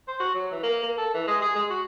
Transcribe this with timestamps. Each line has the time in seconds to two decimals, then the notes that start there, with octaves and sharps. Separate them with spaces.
0.08 C5
0.20 F#4
0.35 F#3
0.52 E3
0.63 A#3
0.83 A#3
0.98 A4
1.14 E3
1.27 G#3
1.41 G#4
1.56 G#3
1.70 F#4